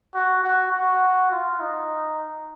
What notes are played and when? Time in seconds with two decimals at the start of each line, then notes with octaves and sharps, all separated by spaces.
0.15 F#4
0.43 F#4
0.72 F#4
1.32 F4
1.60 D#4